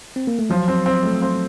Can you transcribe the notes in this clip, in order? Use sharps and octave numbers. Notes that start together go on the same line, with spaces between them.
C4
A#3
A3
F3 F#3
C4
C4
A3
C4